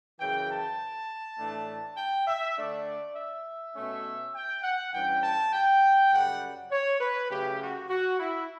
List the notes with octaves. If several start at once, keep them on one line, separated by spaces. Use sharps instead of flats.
F#2 C#3 E3 G5
A5
A2 E3 A3 D4
G5
E5
D3 A3 D4 D5
E5
B2 A3 C#4
G5
F#5
G2 E3 G3 C#4 G5
A5
G5
F#2 C#3 G3 F#5
C#5
B4
C#3 F#3 A3 C#4 G4
F#4
F#4
E4